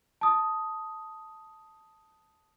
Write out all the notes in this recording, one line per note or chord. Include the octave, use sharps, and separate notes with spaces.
A5 D#6